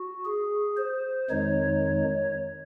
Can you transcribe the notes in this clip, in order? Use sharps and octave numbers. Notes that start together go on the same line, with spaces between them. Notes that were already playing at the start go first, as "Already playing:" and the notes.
Already playing: F#4
G#4
C5
F2 D#3 G#3 D#4 C#5